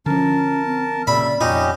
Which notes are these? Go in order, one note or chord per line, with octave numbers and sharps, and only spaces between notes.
D3 F3 C#4 A#4 A5
C4
A#2 C#3 G3 D5 E5 B5
F2 A#2 C#4 D#4 G4 D#5